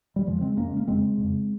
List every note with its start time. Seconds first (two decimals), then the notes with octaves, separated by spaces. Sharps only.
0.16 G3
0.26 F2 C#3 F3 G#3
0.41 G#3 C4
0.57 F2 C#3 A#3 C#4
0.67 G#3
0.77 A#3
0.87 F2 C#3 G#3 C4
1.18 F2 C#3